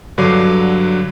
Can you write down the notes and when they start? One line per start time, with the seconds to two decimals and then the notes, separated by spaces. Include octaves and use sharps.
0.18 G2 D3 F#3 D6 C7 D#7